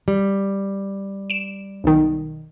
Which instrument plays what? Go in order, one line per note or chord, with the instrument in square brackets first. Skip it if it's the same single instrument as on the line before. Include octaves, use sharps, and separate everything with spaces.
[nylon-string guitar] G3
[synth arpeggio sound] D7 E7
B1 D#3